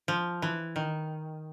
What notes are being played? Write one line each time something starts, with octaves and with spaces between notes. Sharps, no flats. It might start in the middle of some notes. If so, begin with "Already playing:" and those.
F3
E3
D#3